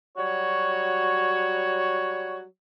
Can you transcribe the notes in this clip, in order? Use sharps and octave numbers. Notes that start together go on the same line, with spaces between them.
F#3 G3 F#4 C#5